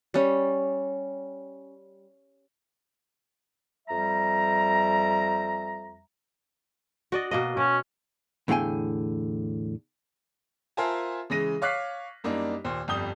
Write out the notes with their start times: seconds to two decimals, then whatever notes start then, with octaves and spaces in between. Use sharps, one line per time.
0.14 G3 C#4
3.88 F2 G3 E5 A#5
7.12 F#4 D5 D#5
7.31 B2 A#3 D#5
7.57 B2 C#4
8.48 E2 A2 D3 F5 G5 G#5
10.77 F4 A#4 C5 E5 G#5 A5
11.30 C#3 E3 G#3 A#6 D#7
11.62 C#5 F5 D6 F#6 B6 C7
12.24 F#2 G3 A#3 D4 D#4
12.64 D#2 A#2 C5
12.88 G1 F2 G3 D#6 G6 G7